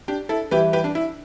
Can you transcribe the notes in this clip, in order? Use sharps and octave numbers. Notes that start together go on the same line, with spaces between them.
D4 G4
E4 A4
E3 G3 E4 G4 B4
G4 B4
D4
E4